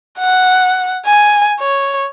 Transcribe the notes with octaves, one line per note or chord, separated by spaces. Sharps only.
F#5
G#5
C#5